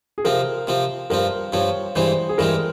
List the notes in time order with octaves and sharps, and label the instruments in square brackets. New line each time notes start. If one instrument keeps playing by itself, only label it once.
[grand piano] G#4
[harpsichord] C3 F3 C4 [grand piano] A#4
[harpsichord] C3 F3 C4
[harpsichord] G2 F3 C4 [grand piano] A#4
[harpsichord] G2 F3 C4 [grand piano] C#5
[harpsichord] G2 E3 G#3 C4 [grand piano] C5
[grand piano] G#4
[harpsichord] G2 E3 G#3 C4 [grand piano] A#4